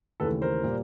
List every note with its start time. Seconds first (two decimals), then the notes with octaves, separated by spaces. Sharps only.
0.20 D#2 C#3 E3 A3 A4 B4
0.42 A#4 C5
0.63 A#2 G3